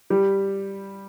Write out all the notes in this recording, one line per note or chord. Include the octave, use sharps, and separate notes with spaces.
G3 G4